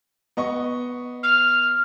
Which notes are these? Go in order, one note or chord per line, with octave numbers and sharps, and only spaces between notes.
B3 D#5 C#6
F6